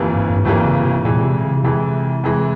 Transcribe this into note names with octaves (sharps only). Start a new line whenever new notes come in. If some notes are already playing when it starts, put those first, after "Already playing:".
Already playing: G1 F2 E3 G3 A#3
G#2
G2
G1 F2 G#2 E3 G3 A#3
C#3
C3
F2 A#2 E3 G#3
C3
C#3
C#3
F2 C3 E3 G#3
F2 E3 G#3